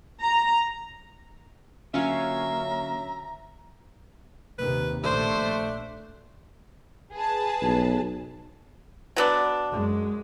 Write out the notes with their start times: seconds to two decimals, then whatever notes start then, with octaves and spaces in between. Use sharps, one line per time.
0.21 A#5
1.94 D3 F#3 A#3 C#4 F4 E5 F5 A#5
4.59 D#2 C3 D#3 B4
5.04 A#1 A3 D4 C5
7.14 G#4 B4 A5
7.62 B1
9.16 F#3 B3 D4
9.72 F#2 G#3